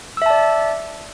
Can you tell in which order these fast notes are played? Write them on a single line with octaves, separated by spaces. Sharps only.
E6 E5 A5 D5